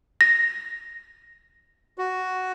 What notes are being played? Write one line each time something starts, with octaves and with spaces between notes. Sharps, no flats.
A#6
F#4